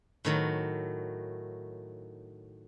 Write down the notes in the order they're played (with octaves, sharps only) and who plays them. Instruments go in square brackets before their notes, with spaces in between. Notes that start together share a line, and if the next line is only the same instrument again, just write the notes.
[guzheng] A2 D#3 F#3